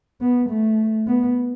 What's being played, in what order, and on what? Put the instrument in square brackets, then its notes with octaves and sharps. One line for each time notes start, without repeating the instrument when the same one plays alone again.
[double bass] B3
A3
B3